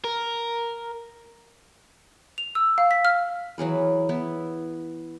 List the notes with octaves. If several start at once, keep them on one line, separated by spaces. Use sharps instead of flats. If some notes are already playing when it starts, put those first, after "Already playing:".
A#4
F7
E6
F5
B6
F6
E3 F#3 G#4 B4
B3 E4